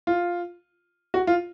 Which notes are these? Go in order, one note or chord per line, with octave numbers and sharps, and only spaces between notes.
F4
F#4
F4